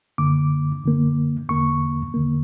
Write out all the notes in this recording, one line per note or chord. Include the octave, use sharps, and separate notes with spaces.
F#2 D3 A#3 D6
F#2 D3 A#3
E2 D3 A#3 C#6
E2 D3 A#3